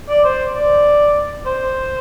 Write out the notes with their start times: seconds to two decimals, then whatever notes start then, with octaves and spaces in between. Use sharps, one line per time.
0.09 D5
0.24 C5
0.55 D5
1.46 C5